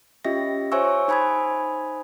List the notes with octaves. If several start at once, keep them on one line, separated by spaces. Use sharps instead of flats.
C#4 F4 G4 D#5 E5 A#6
C5 C#5 E5 G#5 C#6 E6
D#4 C5 G#5 B5 D#6 G#6